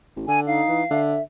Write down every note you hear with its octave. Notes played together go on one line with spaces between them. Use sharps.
A1
D3 G#5
D#4 F5
E3
D3 E5